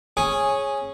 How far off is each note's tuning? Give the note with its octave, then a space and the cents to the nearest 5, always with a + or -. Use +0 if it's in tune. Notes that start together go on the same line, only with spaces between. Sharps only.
C#4 -10 G#4 +0